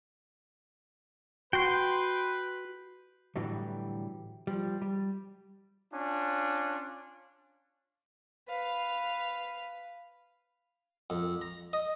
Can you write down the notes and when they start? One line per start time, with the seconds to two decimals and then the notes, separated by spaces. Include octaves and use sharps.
1.53 F#4 B4 G5 C6
3.36 A2 D3 E3 F#3 G3
4.47 F3 G3
4.82 G3
5.93 C#4 D4 F4
8.49 B4 F5
11.10 F2
11.41 A#5
11.73 D#5